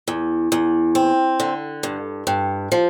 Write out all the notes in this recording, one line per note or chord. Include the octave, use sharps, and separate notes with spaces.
E2
E2
C4
D3
G2
G2
F3